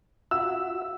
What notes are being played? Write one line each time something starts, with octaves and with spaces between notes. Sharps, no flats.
F4 F#4 E5 E6